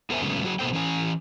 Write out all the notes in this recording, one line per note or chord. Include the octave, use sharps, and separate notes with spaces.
B3 G#4 A#4 C5 E5 G#5
C#3 F#3 G#3 A3 B3 C#4
F#3 F#4 G#4
B2 A#3 B3 A4 C5 G5
E3 C#4 G#5